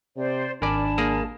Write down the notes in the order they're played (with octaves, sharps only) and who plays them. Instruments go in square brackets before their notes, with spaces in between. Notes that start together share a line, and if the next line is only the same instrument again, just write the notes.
[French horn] C3 [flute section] C5 D5
[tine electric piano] G#1 G#5 B5 [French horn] D4 [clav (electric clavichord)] A#4 D5 [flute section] A5
[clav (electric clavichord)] A#3 G#4 A#4